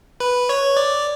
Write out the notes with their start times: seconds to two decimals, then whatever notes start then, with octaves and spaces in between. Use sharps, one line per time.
0.20 B4
0.49 C#5
0.77 D5